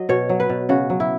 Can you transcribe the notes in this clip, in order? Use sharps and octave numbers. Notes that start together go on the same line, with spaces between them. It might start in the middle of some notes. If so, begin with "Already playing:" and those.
Already playing: F#3 D#5
B2 C#5
F#3
B4
B2
C#3 F#4
F#3
E4